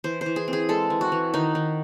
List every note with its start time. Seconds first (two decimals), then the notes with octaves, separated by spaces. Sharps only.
0.04 E3 C5
0.21 C5
0.26 E3
0.36 G#4
0.48 C4
0.53 G#4
0.69 G#3 A4
0.90 E3
1.01 F#4
1.12 E3
1.34 D#3 D#4
1.55 D#3